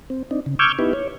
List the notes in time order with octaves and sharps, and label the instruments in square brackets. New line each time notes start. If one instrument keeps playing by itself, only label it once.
[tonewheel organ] C4
C4 D4 D#4
C#3
C#6 D6 E6 F6 G6 G#6
B3 D#4 E4 G4 B4
C#5